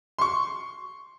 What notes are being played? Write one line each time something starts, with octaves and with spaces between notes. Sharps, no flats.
C6 C#6